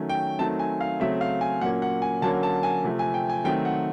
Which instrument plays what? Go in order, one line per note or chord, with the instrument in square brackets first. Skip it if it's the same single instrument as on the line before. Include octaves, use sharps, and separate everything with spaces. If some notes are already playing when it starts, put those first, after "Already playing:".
Already playing: [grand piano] D#3 F#3 A3 C#4
G5
D#3 F#3 A3 C4 A5
G#5
F5
C#3 F#3 A3 C4 E5
F5
G#5
A#2 F#3 A#3 C#4 F#5
F#5
G#5
D3 F#3 A#3 C#4 A5
A5
G#5
C3 F3 A3
G#5
G5
G#5
D#3 F#3 A3 C4 G5
F#5